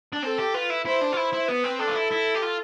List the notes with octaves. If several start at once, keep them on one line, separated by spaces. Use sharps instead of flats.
D4
C4 A4
G4
F4 B4
E4
E4 C5
D4
F4
E4 C5
E4
B3 B4
C4
D4 A4
F4
E4
E4
G4
F4